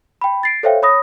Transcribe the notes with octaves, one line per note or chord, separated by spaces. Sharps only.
G5 B5
A6 C7 D7
A4 C5 C#5 E5 F5 G5
C#5 B5 D#6 A#6